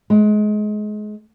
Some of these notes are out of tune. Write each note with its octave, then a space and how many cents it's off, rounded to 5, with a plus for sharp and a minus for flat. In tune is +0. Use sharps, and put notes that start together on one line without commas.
G#3 +25